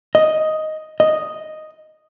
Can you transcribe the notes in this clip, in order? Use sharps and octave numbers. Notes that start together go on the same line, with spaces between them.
D#5
D#5